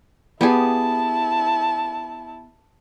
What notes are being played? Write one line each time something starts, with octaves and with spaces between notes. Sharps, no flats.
B3 E4 G4 G#4 A5